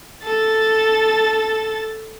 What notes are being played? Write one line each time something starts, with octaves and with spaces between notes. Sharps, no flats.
A4 A6